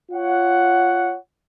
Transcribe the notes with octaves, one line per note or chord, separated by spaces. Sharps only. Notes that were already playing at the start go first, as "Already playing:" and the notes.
F4 C#5 F#5